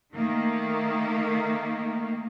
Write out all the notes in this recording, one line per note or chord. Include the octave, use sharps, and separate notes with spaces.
D#3 A3 A#3